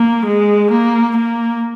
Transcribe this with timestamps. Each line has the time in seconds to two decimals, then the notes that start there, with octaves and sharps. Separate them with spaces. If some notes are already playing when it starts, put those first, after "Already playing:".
Already playing: A#3
0.27 G#3
0.72 A#3
1.17 A#3